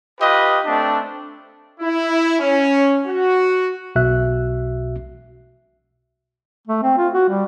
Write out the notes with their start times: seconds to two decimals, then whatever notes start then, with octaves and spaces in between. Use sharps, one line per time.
0.21 F4 G4 B4 D#5
0.66 A3 C4 D4
1.80 E4
2.40 C#4
3.07 F#4
3.96 B1 B2 F#4 E5 F#6
6.67 A3
6.83 C4
6.98 F4
7.14 F#4
7.29 G3